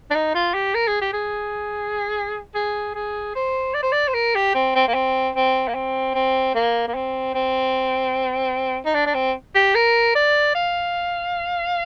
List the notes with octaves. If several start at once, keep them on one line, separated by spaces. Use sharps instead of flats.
D4
D#4
F4
G4
A#4
G#4
G4
G#4
G#4
G#4
C5
D5
C5
D5
C5
A#4
G4
C4
C4
A#3
C4
C4
A#3
C4
C4
A#3
A#3
C4
C4
D#4
D4
D4
C4
G4
A#4
D5
F5